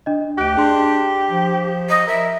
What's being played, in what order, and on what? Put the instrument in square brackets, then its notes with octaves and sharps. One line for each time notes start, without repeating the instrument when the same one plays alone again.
[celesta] D4 D#5
[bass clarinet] D2 [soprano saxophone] G4 [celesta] F#6 D7
[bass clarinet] D4 [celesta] G#4 C6
[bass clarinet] F3
[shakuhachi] D#5
[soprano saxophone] A#4 [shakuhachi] E5